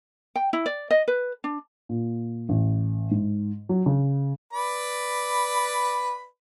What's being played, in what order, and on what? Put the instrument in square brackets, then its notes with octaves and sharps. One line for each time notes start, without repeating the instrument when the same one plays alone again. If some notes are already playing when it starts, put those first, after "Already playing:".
[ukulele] G5
E4
D5
D#5
B4
D4
[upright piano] A#2
A1
G#2
F#3
C#3
[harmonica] B4 D5 B5